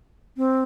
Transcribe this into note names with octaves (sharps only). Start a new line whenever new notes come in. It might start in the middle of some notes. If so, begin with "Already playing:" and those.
C4